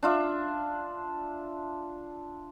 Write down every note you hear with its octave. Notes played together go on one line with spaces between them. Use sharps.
D4 F4 E5